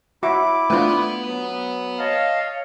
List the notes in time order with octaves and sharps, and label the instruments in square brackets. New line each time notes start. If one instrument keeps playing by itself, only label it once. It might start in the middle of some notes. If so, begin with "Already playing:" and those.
[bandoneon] E4 D6 [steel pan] F#4 E5
[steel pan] A3 D4 F4 [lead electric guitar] B4 F#5
[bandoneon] F#3
[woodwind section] C#5 F5 [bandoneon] D#5 A5